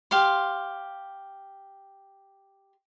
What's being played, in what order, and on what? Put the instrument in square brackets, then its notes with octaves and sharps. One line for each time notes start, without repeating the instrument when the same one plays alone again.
[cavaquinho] G4 F5 C6